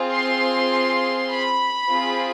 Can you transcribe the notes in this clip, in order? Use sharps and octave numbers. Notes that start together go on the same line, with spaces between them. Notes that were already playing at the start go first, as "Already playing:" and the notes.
Already playing: C4 F4 G#4
C6
B5
C4 F4 G#4